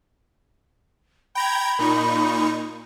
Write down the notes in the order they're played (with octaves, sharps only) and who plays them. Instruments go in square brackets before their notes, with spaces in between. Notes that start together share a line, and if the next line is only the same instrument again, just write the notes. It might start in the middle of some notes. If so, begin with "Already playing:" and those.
[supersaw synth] G5 A#5 G#6 [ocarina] B5
[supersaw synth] A#2 D#4 C#6